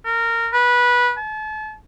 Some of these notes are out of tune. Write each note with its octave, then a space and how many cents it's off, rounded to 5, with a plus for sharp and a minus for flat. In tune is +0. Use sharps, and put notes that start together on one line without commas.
A#4 -15
B4 -15
A5 -35